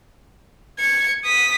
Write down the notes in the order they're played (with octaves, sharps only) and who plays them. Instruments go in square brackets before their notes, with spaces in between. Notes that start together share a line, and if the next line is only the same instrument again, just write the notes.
[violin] G#6 C#7
D#6 B6